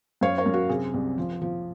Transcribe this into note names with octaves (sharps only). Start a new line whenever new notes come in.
F#2 C#5 F5
A#4 C#5
F#2
F#4 A#4
C3 G#4
C2
F3
F3